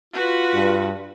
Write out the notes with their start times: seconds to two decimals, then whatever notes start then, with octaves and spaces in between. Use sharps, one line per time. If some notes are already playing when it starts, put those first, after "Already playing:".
0.13 F4 F#4 B4
0.54 G2